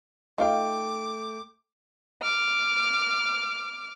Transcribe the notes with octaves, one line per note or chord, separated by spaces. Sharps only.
A3 D#4 F4 F5 G5 D6
D6 F6